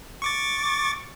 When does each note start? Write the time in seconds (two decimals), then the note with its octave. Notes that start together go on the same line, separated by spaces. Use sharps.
0.22 C#6 D6 A6